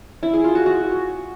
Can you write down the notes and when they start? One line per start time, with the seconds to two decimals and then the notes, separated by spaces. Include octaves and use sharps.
0.23 E4
0.33 G#4
0.44 F4
0.55 F#4
0.66 F#4